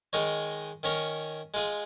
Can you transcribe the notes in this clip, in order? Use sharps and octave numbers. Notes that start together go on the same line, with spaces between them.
D#3 G#3 D#4 A#4 C#5
D#3 C#4 A#4 C#5
G#3 F4 G#4